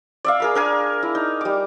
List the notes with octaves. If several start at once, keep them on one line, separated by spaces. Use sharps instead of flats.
D5 E5 F5
G#4 A#4 B5
D4 A#4 G#5
E4
D#4
G3 D6